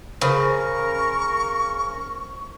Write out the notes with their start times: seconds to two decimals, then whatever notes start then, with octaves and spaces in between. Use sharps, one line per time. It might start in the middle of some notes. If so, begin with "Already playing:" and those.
0.21 C#3 A#4 C5 B5 C#6 D#6